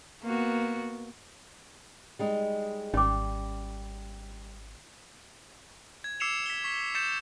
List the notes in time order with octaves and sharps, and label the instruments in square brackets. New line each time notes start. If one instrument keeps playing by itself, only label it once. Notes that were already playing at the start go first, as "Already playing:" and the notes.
[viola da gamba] A#3 B3 F#4
[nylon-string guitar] G3 G#3 D#4
[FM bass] G#1 [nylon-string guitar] G3 [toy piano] C#4 D6
[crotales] G#6
D6 E6 C7 C#7 E7 F7
B6 G7
C#6 B6
D6 G6 A6 C#7 E7